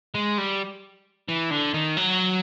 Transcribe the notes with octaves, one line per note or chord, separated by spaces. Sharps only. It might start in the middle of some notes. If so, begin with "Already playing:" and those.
G#3
G3
E3
D3
D#3
F#3